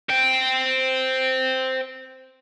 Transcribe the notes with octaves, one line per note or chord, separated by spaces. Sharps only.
C5 G5